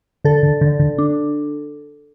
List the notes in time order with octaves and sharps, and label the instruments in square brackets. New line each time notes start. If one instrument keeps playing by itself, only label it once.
[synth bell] D3 A4
D3
D3
D3
D4